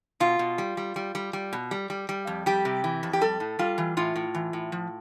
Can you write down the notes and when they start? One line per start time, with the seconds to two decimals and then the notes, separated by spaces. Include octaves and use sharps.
0.20 B2 F4
0.39 B2
0.58 G3
0.77 G3
0.96 G3
1.15 G3
1.33 G3
1.53 B2
1.71 G3
1.90 G3
2.09 G3
2.27 F2
2.46 G3 G4
2.65 C3
2.84 E3
3.03 F2
3.13 G4
3.21 G3 A4
3.40 A2
3.59 G3 F4
3.78 E3
3.97 A2 F4
4.16 A2
4.35 E3
4.53 A2
4.72 F3